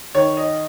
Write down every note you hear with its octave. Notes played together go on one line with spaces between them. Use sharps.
D#3 C#5
D#5